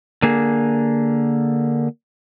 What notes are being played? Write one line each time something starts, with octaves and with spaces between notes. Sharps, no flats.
D3 A#3 G#4